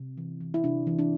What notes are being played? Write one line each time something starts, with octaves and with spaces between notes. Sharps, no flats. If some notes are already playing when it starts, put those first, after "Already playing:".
Already playing: C3
E3
E3
E4
C3 D4
E3
D4